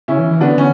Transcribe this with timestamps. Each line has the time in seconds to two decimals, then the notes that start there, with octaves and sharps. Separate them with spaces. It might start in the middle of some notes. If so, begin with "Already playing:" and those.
0.08 C#3 C#4 E4
0.19 E3
0.31 E3
0.41 D3 B3 D4
0.58 C#4